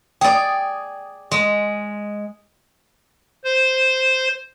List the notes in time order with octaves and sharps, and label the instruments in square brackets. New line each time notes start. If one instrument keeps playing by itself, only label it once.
[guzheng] G#4 D5 [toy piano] G5 D#6
[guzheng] G#3 [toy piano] C6
[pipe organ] C5